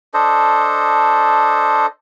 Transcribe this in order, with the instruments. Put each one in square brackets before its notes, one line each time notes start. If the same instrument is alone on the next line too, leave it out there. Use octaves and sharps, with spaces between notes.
[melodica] D4 A4 C5 D#5